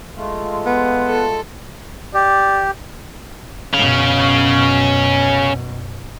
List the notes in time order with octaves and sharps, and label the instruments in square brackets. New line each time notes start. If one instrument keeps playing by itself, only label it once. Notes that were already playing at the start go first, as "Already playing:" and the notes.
[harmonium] G#3 A3 F4
[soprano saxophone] B3
[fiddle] A4
[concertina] G4 [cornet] D5
[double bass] F#2 B2 [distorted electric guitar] C#4 F5